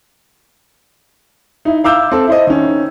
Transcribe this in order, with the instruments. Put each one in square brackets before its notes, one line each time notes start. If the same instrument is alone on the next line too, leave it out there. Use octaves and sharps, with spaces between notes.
[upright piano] D#4 E4
E4 F5 D6 E6 G6
C4 A4
E4 C5 D#5
D#3 C#4